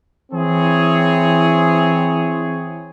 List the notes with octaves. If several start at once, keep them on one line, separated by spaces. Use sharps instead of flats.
E3 C4 E4 G#4 C#5